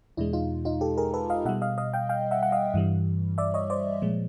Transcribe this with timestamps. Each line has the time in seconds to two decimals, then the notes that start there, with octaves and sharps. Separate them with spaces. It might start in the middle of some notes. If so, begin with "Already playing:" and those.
0.17 E2 B2 G#3 D4 E4
0.33 D#4 F4
0.65 D#4 F4
0.81 G4 A4
0.97 G#4 A#4
1.14 A4 B4
1.30 D#5 F5
1.45 B2 E5 F#5
1.49 G3
1.62 D#5 F5
1.78 D#5 F5
1.94 F5 G5
2.09 F5 G5
2.31 E5 F#5
2.43 F#5
2.52 D#5 F5
2.74 G2 E3 G3
3.38 D5 E5
3.54 C#5 D#5
3.70 C5 D5
4.02 A#2 F3 G#3